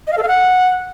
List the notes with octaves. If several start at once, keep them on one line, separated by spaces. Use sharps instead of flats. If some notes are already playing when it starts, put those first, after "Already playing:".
D#5
F5
A4
F5
F#5